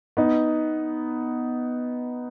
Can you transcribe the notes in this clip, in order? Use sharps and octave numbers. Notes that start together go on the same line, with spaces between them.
B3 D#4